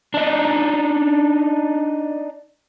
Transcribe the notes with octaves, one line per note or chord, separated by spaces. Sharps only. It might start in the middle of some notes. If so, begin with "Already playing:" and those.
D4 D#4